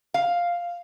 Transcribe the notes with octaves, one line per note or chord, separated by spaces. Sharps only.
F5